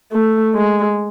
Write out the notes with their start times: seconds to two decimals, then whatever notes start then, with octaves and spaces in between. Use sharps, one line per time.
0.12 A3
0.55 G#3